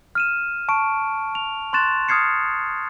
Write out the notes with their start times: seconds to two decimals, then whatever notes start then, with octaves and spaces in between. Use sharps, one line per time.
0.15 F6 D#7 E7
0.68 A5 C#6 D7
1.35 F7
1.73 C6 C#6 F#6 A6 E7
2.08 D#6 F6 G#6 C7 C#7